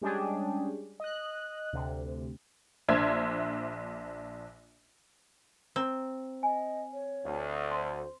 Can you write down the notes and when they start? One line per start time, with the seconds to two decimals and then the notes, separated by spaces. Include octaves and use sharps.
0.01 G3 G#3 C#4 D4 G4 G#4
1.00 D#5 F#6
1.73 D2 C3
2.89 A#1 D4 C5 E5 G#6
5.76 C4 A#5
6.43 D#5 G#5
6.93 C#5
7.25 D2
7.71 C5 C6